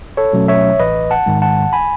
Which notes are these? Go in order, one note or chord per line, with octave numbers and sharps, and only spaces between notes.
A4 C#5
B2 F#3 A3 C#4
C#5 E5
A1 B4 D#5
F#5 A5
G#2 D#3 G#3
F#5 A5
G#5 B5